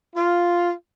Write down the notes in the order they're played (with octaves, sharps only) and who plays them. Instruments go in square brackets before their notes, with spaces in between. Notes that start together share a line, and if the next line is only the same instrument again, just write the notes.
[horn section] F4